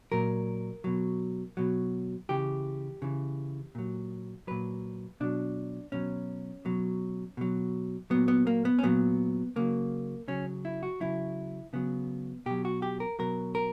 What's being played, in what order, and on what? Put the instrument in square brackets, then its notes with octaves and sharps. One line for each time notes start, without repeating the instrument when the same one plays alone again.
[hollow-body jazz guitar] A#2 F#3 A#4
B2 F#3
B2 F#3
C#3 E3 G4
C#3 E3
A#2 F#3
A#2 F#3 B4
B2 F#3 D4
B2 F#3 C#4
B2 F#3
B2 F#3
A#2 F#3 B3
B3
A#3
B3
C#4
A#2 F#3 B3
C#3 F#3 A#3
C#3 F#3 C#4
E4
F#4
C#3 F#3 E4
C#3 F#3 B3
B2 F#3 G4
F#4
G4
A#4
B2 F#3 A#4
A#4